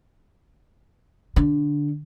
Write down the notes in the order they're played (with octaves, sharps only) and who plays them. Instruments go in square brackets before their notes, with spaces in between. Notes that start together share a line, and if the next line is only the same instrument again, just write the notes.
[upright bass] D3